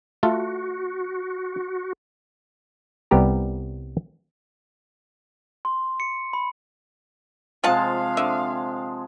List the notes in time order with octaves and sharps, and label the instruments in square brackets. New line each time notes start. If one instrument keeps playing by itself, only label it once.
[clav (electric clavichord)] A3 F4 A4 [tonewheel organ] F#4
[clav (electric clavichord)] C2 G3 B3 G4 A#5
[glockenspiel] C6
C#7
B5
[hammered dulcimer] C3 F3 G#3 [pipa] F4 F#5 A5 [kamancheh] F5
[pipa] D3 E5